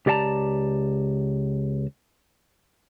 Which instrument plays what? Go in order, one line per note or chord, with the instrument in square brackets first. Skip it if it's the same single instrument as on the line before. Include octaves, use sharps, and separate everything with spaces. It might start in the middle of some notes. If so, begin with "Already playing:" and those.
[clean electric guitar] C#2 G4 D5 D#5 A5 A#5